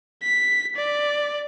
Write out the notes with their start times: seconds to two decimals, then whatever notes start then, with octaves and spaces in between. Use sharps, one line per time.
0.23 B6
0.76 D5